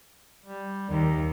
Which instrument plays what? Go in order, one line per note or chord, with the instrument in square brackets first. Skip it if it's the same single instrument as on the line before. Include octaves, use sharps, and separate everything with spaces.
[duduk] G3
[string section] D#2 [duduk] D#3